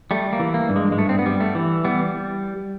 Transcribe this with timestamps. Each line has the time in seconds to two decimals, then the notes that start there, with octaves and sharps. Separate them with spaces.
0.11 G3 A3
0.33 A#3
0.39 E3
0.54 A#3
0.69 G2
0.76 G#3
0.92 G#3
0.98 G2 A3
1.09 C4
1.19 B3
1.26 G3
1.40 A3
1.55 E3
1.85 G3 B3